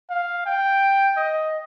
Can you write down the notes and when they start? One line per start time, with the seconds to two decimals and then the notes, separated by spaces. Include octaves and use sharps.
0.10 F5
0.46 G5
1.17 D#5